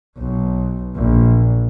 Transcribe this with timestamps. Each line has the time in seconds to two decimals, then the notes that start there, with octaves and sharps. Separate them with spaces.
0.18 B1
0.96 A#1